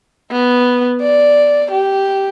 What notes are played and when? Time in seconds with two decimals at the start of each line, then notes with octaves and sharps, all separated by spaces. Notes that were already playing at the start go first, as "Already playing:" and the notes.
0.32 B3
1.02 D5
1.72 G4